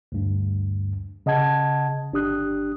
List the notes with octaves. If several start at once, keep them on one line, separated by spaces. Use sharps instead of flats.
D2 G2
C#3 D#5 F#5 A5 G#6
G1 D4 G4 D#6 F#6